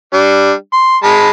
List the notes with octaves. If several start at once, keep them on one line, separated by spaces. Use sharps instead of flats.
G3 D4
C6
G#3 A5 B5